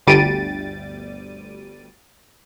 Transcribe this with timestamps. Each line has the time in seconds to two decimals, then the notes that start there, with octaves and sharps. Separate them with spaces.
0.07 G1 D2 G3 A6 D7 D#7